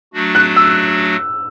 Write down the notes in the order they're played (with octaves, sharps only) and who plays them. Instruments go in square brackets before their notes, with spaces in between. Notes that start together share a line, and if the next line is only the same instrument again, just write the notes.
[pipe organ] F#3 A3 D4 F#4
[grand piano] F#6
E6